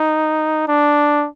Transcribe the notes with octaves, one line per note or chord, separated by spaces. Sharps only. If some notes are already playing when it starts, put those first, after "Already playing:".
Already playing: D#4
D4